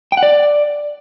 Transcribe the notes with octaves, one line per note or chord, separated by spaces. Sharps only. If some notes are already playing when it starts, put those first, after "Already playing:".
G5
F#5
D5